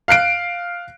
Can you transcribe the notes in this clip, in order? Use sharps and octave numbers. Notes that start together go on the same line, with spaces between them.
F5 F#6 C7 D7